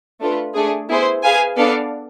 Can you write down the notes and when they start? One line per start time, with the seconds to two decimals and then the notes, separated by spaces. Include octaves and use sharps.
0.21 A3 D4 F4 B4
0.55 A3 D4 G#4
0.89 B3 E4 G#4 C5
1.24 G#4 B4 F5 G#5
1.57 B3 D4 A4 D5 F5